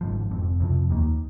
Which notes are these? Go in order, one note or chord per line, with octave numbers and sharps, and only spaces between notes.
G#1 G#2 F3
F1 F2 C3
F2 C3 F3
D#2 D#3 A#3